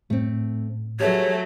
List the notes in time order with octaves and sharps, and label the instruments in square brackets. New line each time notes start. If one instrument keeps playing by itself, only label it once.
[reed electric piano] A2 [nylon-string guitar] A3 C4
[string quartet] F#3 A3 [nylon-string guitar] G4 G#4 B4 [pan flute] C#5